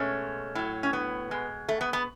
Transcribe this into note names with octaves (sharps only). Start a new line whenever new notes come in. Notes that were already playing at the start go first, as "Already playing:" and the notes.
Already playing: B2 G#3 A3 C#4
A2 F#3
C#4
B3
B2 G#3
A3
B3
B3